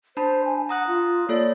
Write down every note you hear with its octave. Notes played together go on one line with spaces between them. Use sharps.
D4 C5 A5 B5
G#5
F#5 A#5 D#6 F#6
F4
A#3 A4 C#5 D5